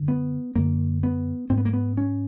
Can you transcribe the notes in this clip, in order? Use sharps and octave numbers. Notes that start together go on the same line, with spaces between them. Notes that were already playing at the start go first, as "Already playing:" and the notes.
Already playing: F#2 D3
B3
F#2 D3 A#3
B3
G#2 C4
B3
A#3
B3
C#4